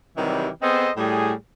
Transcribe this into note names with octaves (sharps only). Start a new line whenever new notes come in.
C3 D#3 E3 F#3 G3
B3 C4 G#4 A4 C5 D#5
A2 G3 G#4